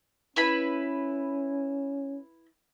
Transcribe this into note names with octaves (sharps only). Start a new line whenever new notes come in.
C#4 E4 B4 B5